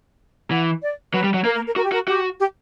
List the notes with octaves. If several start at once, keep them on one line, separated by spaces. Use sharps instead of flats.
E3 F#5
D5
F#3 B4
G3
F#3
A#3 A#4
A#4
A#4
F#4 A#4
G4
F#4 A#4
F#4 G4
G4